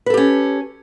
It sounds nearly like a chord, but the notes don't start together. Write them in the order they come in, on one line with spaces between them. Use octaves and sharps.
B4 A4 G4 C#4